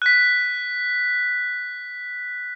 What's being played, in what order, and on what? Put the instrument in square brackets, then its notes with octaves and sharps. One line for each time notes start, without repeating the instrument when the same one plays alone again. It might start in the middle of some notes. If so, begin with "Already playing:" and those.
[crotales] F#6 B6